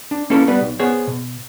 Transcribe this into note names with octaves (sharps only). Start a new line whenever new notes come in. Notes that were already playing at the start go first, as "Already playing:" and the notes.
D4
A#3 C#4 E4 A4 B4
G3 B3 B4
B1
B3 G#4 C5 C#5
B2